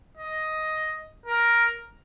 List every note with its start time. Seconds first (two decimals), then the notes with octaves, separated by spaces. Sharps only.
0.17 D#5
1.26 A#4